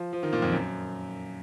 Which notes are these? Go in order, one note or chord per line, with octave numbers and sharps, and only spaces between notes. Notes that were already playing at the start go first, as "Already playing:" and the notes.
Already playing: F3
F3
D#3
A#2
F2
F#2